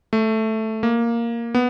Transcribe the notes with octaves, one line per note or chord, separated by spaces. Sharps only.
A3
A#3
B3